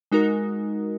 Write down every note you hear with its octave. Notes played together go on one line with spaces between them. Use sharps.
G#3 D#4 F#4 A#4